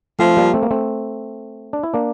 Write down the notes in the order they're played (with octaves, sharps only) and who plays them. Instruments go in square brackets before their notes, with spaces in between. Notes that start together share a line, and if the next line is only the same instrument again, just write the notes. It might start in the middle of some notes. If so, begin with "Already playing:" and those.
[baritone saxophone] F3 [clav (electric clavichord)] A3 C4
[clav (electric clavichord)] G3 A#3
A3 C4
A#3
A3 C4
D4
E4
A#3 D4